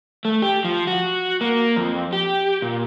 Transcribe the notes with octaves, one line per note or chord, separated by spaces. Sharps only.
A3
G4
F3
F#4
A#3
F2
G4
A#2